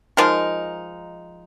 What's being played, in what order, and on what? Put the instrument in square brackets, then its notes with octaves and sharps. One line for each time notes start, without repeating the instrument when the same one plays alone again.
[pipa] F3 G#3 D#4 A#4